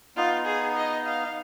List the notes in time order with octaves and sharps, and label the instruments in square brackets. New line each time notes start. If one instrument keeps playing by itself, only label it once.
[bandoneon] B3 D#4 [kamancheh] F4
[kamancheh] G#4
D#5
F5